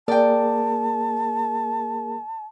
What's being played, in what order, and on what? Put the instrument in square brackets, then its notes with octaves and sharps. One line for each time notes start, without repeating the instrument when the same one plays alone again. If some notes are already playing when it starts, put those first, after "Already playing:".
[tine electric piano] A#3 G#4 A#4 [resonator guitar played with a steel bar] D5 G5 [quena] A5